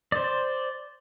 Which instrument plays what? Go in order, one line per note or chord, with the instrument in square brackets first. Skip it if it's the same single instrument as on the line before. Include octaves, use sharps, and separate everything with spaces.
[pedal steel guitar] C5 D5